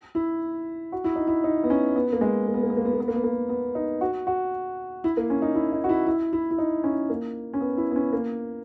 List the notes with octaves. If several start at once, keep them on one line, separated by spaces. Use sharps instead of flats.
E4
F#4
E4
D#4
E4
D#4
B3
C#4
B3
A#3
G#3
A#3
B3
A#3
B3
A#3
B3
A#3
B3
A#3
B3
A#3
B3
D#4
F#4
F#4
E4
A#3
C#4
D#4
E4
D#4
F#4
E4
E4
E4
E4
D#4
C#4
A#3
C#4
B3
E4
B3
C#4
A#3